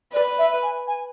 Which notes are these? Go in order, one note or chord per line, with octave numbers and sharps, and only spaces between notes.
B4 D5
E5
G#5
G#5